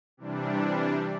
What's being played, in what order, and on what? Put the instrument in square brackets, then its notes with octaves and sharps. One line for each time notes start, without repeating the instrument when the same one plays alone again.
[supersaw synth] C3 E3 G3 D4